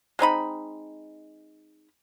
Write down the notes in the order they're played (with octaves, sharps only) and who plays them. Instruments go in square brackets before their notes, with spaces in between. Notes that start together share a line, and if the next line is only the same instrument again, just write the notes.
[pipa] G#3 C4 D#4 B5